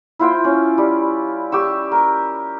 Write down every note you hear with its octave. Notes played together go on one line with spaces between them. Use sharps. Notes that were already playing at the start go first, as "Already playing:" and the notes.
E4 F4 C5 G5
C#4
G3
G4 C#6 E6
A#4